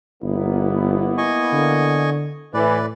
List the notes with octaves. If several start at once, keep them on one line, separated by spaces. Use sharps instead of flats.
G1 A#3 B3 E4
D#5 G#5 C#6
D3
A2 E3 B4 D5